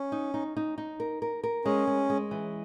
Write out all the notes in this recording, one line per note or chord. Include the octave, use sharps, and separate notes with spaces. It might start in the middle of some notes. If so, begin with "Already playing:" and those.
Already playing: C#4
D#4
D#4
D#4
D#4
A#4
A#4
A#4
G#3 C#4
G#3
G#3
E3